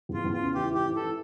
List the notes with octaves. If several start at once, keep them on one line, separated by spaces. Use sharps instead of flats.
E2 F4
E2
F4
C#3
E3 G4
E3 G4
E3
A4
E3